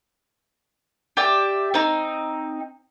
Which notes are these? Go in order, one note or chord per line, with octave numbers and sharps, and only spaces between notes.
G4 D5 E5 G5
C4 D#4